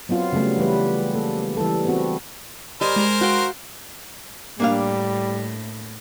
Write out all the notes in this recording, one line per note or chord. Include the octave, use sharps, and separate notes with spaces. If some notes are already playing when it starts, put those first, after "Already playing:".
F#3 B3 C4 F4
C#3 F#3 G3 A3 B3
E3 G3 B4
A#3 A4
E3 G3 A4
B3 C4 F#4
G3 A#4 C5 D#5 G#5
G#3 G#5 A#5
F#4 F5 G5
A2 G3 A#3 D4 F5